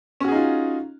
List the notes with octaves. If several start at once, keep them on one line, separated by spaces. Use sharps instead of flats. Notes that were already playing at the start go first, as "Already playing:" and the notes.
C#4 D#4 F4 F#4 G#4